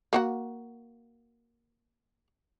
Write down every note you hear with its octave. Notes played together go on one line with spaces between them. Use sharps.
A#3 F#4 F#5